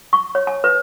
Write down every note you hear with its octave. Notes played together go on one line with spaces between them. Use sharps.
C#6
C#5
G#5
B4